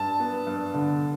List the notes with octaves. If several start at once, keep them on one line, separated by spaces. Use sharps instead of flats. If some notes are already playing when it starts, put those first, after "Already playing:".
Already playing: G2 A5
B3
G2
D3